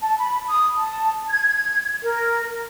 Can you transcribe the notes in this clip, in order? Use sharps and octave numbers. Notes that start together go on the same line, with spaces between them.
A5
B5
D#6
A5
G#6
A#4